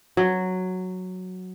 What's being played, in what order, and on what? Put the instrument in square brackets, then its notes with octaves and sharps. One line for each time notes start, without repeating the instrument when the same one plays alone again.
[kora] F#3